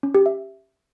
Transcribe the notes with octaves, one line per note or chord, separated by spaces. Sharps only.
C#4
G4
E5